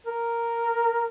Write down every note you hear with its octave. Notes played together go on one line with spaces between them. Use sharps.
A#4